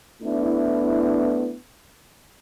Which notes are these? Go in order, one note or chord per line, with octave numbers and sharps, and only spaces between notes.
A3 B3 D4 E4